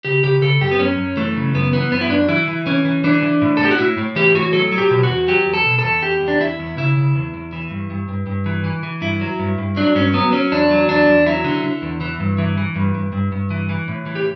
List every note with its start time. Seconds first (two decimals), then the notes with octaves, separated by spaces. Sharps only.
0.05 C#3 G4
0.24 C#3 G4
0.42 C#3 A4
0.61 F#2 G4
0.71 B3
0.79 F#2 C#4
0.98 F#2
1.17 E3 A3
1.36 C#3
1.55 F#2 B3
1.73 E3 B3
1.92 F#2 B3
2.01 E4
2.10 F#2 D4
2.29 E3 E4
2.48 E3
2.67 E3 C#4
2.85 E3
3.04 E3 D4
3.23 E3
3.42 A2
3.57 A4
3.61 A2 G4
3.71 F#4
3.78 A2 E4
3.98 A2
4.16 E3 G4
4.35 A2 F#4
4.53 F#3 A4
4.72 F#3
4.78 G4
4.91 B2
5.03 F#4
5.09 E2
5.28 F#3 G4
5.46 E2
5.54 A4
5.66 B2
5.79 A4
5.84 E2
6.03 E2 G4
6.21 E2
6.28 D4
6.40 E2 E4
6.59 E2
6.77 C#3 E4
6.97 C#3
7.16 E2
7.34 E2
7.53 E3
7.71 G2
7.90 G2
8.09 G2
8.27 G2
8.46 E3
8.64 E3
8.83 E3
9.01 G2 E4
9.21 F#3
9.39 G2
9.58 G2
9.76 F#3 D4
9.95 G2 C#4
10.14 F#3 B3
10.32 F#3 C#4
10.52 E2 D4
10.71 F#3
10.89 E2 D4
11.08 E2
11.26 F#3 E4
11.44 D3
11.64 D3
11.82 E2
12.01 E3
12.20 G2
12.38 E3
12.58 E3
12.76 G2
12.95 G2
13.12 G2
13.32 G2
13.50 E3
13.69 E3
13.88 A2
14.06 E3
14.15 G4